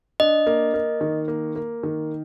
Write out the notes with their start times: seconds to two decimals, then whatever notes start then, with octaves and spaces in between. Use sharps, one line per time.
0.20 D4 D#5
0.47 A#3
0.74 A#3
1.01 D#3
1.28 A#3
1.56 A#3
1.83 D#3